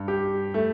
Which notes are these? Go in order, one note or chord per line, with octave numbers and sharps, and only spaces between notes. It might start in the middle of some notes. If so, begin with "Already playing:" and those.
Already playing: G2
G4
A3